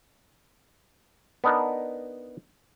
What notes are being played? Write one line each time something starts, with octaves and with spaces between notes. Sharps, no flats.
B3 D4 D#4 A#4